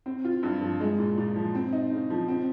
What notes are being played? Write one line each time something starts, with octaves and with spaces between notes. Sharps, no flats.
C4
F4
G2
F3
G#3
A#2
A#2
F3
C4
D#4
C#3
F3
C4